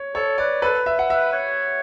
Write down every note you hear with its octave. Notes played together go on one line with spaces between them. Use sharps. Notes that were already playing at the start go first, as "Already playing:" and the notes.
Already playing: C#5
A4 C#5
B4 D5
A4 B4
E5
F#5
B4 E5
C#5